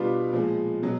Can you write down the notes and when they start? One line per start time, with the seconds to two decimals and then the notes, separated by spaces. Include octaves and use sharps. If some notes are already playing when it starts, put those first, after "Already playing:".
Already playing: B2 G3 B3 D4 F4
0.32 A#2 F3 G#3
0.83 B2 F#3